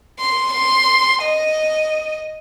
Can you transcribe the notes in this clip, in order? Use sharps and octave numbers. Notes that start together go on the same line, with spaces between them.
C6
C6
D#5